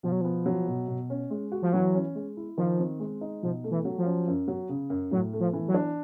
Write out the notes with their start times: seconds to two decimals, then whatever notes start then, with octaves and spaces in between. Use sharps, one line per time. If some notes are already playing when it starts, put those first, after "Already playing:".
0.03 B2 F3
0.12 F#3
0.21 F3 B3
0.46 F#3
0.68 B2
0.88 B2
1.10 C#4
1.31 G#3
1.52 F#4
1.62 F3
1.73 E3 F#3
1.95 C#4
2.15 G#3
2.37 E4
2.58 D#3 F3
2.79 C4
3.00 G#3
3.21 D#4
3.42 B2 F3
3.64 A3
3.71 E3
3.85 F#3
3.98 F3
4.05 C#4
4.27 F#2
4.48 F#3
4.69 C#3
4.90 F#2
5.11 A2 F#3
5.33 A3
5.40 F3
5.53 E3
5.68 F#3
5.74 D4